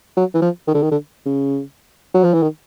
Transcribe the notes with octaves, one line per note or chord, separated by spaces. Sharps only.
F#3
E3
F3
D#3
D3
D#3
D3
C#3
F#3
F3
E3
D#3